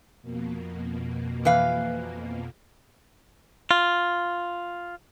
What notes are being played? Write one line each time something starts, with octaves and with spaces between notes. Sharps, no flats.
F2 B2 A#3
E3 B4 F5
F4